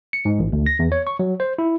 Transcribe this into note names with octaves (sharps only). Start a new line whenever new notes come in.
C#7
G#2
A1
D2
A#6
E2
C#5
C#6
F#3
C5
E4